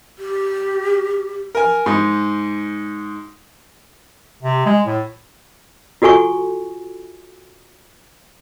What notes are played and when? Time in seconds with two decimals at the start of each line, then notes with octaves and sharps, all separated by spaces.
0.19 G4
1.55 A#4 G#5
1.86 G#2 D#4
4.42 C3
4.66 G#3
4.86 A2
6.02 F4 F#4 A4 G#5 C#6